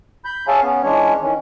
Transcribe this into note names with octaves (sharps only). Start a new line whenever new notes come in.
B5 G6
G#4 C#5 E5 F5 G#5 A5
B3 C#4
E3 G#3 C#4 D4 C#5
D#3 E3 C#4